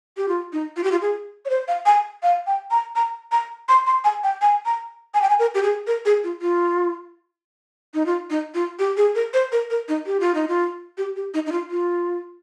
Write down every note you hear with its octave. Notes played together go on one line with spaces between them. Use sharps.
G4
F4
D#4
F4
G4
F4
G#4
C#5
C5
F5
G#5
F5
G5
A#5
A#5
A#5
C6
C6
G#5
G5
G#5
A#5
G#5
G5
G#5
A#4
G4
G#4
A#4
G#4
F4
F4
D#4
F4
D#4
F4
G4
G#4
A#4
C5
A#4
A#4
D#4
G4
F4
D#4
F4
G4
G4
D#4
D#4
F4
F4